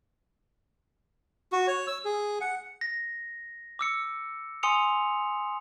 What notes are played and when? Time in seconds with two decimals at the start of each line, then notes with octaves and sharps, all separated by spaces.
1.52 F#4
1.67 C#5
1.87 E6
2.05 G#4
2.41 F#5
2.81 A#6
3.79 D6 E6 C#7
4.63 G#5 C6 D#6 C#7 F7